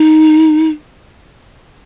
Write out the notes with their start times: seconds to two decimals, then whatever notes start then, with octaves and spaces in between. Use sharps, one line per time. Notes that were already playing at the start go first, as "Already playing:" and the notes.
Already playing: D#4